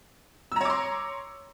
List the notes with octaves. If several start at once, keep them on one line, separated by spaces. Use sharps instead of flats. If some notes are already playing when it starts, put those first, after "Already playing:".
C#5 A#5 C6 D6 E6